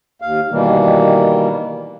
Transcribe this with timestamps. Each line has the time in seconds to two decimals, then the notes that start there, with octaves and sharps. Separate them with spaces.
0.22 D#2 F5
0.51 B2 D#3 E3 G3 A#3